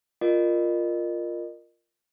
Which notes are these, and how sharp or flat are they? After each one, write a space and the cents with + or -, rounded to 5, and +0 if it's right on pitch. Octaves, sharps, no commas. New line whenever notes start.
F4 +0 A#4 +0 D#5 -35